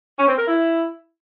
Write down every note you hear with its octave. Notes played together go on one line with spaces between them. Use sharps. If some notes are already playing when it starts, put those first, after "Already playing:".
C#4
C4
A#4
E4